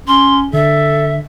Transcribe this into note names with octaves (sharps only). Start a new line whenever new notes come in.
C#4 C6
D3 A4 E5